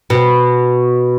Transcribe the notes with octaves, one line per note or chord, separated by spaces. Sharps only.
B2